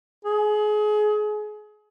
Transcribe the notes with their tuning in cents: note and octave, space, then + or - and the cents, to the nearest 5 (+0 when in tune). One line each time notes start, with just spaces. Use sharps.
G#4 +30